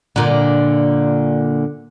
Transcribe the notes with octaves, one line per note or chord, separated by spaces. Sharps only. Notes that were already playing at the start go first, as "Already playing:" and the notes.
A#2 D3